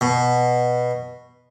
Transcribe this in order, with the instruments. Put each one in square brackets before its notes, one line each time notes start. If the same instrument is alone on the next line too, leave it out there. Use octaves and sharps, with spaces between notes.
[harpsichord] B2